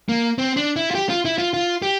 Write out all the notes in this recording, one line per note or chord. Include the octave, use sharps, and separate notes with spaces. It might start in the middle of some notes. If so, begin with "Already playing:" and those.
A#3
C4
D4
E4
F4
G4
F4
E4
F4
F4
G4